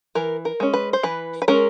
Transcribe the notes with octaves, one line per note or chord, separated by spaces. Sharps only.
E3 A#4
A#4
G#3 C#4
B4
C5
E3 B4
B4
G#3 C#4 A#4